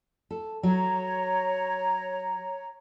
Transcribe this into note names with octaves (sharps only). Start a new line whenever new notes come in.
A4
F#3 C#5 A#5